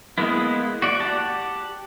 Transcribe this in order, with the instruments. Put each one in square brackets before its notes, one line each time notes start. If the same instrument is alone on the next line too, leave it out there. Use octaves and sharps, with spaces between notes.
[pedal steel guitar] G#3 A#3 B3 E4
F#4 D5
G4 F#5 A5